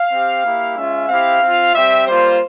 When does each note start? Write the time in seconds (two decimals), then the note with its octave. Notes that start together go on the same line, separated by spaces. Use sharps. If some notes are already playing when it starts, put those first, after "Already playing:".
Already playing: F5
0.12 C4 G4
0.43 A#3 E4 G4
0.76 G#3 C#4 F4 E5
1.08 C4 E4 G4 F5
1.42 C4 F4
1.74 G3 C4 G4 E5
2.07 G3 A#3 F4 C5